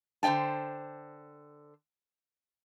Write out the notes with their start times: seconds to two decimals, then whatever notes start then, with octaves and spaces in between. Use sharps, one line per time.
0.23 D3 C5 D#5 G5 A5